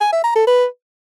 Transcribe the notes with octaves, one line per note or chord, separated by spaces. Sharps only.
G#5
E5
A#5
A4
B4